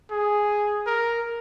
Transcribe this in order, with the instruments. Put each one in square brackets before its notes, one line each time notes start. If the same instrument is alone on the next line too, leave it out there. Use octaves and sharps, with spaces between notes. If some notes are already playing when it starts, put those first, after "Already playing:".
[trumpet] G#4
A#4